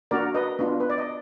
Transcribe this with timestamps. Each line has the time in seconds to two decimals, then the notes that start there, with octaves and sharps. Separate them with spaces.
0.11 A#3 D4 F#4 A#4 D5
0.35 B4 D#5
0.59 B3 D4 F4
0.80 B4
0.90 D5
0.98 D#5